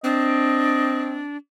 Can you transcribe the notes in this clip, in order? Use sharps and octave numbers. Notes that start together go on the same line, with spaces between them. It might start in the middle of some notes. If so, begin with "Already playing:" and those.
C4 D4 D#5